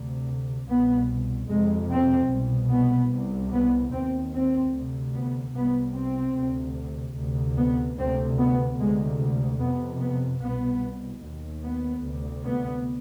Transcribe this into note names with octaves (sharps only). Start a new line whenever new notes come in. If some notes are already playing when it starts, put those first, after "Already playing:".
Already playing: D2 C3
C2 B2 B3
F2 C3 G#3
C4
C2 B2
B3
C2 C3
B3
D#2 C4
C4
D2 C3
B3
C2 C3 B3
C4
D2 C3
D2 C3
B3
D2 C3 C4
B3
D2 C3 G#3
F2 C3 B3
B3
C2 B2 B3
D#2
B3
D2 C3
B3